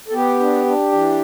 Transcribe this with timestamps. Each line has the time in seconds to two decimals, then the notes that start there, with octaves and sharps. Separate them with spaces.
0.08 A4
0.13 B3 G4
0.40 D4
0.66 D4
0.92 E3